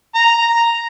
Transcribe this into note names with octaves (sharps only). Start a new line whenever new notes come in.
A#5